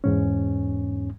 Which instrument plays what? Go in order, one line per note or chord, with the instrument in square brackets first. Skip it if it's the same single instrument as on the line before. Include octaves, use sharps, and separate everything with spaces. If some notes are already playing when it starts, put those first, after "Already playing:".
[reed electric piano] E2 G#2 C#4